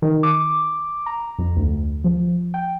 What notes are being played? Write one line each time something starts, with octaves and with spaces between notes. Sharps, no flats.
D#3
D6
A#5
F2
D2
F3
G5